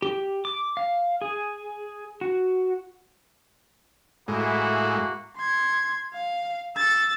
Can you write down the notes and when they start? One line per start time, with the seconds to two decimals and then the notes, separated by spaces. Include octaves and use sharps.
0.02 G4
0.45 D6
0.77 F5
1.21 G#4
2.21 F#4
4.28 A2 G#3 A#3 E4 F#4
5.37 C6 G#6
6.13 F5
6.76 E6 A6